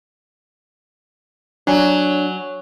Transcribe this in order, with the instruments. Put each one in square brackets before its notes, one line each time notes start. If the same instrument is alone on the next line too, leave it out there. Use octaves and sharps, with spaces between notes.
[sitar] F#3 [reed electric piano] D4 G#5